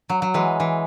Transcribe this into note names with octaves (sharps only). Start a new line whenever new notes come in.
F#3
F#3
E3 G#3
E3